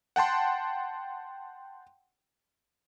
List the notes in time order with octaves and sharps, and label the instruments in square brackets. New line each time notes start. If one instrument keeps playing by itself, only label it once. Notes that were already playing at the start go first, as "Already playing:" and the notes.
[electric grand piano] F#5 G5 A5 C6